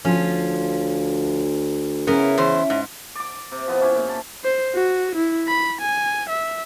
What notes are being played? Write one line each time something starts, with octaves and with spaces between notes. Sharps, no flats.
D2 F3 C#4 F4
C#3 B3 C#4 E4 A#4
E2 C5
G#2
D5 D6
C3
F3 B3 E4
C#4 E4 G4
A#2
A5
C5
F#4
E4
B5
G#5
E5